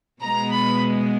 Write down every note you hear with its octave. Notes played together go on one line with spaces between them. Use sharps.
B2 G#3 B3 A#5
B5